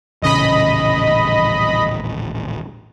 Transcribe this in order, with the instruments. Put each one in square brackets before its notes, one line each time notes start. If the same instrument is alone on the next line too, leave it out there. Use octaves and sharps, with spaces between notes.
[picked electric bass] D#1 A1 C#3 [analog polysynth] D#5 B5